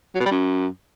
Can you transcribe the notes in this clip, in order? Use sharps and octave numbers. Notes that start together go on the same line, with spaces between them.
F#3
B2
G3
F#2